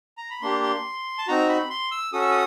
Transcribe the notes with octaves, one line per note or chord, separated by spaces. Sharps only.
A#5
B5
A#3 D4 G4 C6
C6
A5
C4 D#4 F#4 A#5
B5
C6
E6
C#4 F#4 A4 D#6
E6
D#6